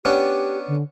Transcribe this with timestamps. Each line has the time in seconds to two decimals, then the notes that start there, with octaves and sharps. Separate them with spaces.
0.05 B3 C#4 D4 G4
0.68 D3